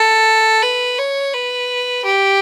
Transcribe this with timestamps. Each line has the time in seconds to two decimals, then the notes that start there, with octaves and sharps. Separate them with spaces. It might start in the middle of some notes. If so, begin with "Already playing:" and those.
Already playing: A4
0.62 B4
0.98 C#5
1.33 B4
2.04 G4